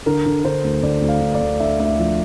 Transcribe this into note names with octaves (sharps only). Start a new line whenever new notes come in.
D3 A#4
D3
D3 C5
D2
D2 D5
D2
F5
D2
D5
D2
D3 E5
D2 D5
E5
F3